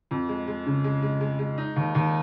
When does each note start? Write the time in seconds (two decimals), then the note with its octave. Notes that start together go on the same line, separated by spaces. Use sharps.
0.11 F2
0.29 G#3
0.47 G#3
0.66 C#3
0.84 G#3
1.03 G#3
1.21 G#3
1.39 G#3
1.58 D#4
1.76 D#2
1.95 D#2